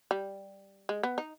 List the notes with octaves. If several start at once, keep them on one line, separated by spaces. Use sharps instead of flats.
G3
G#3
B3
D#4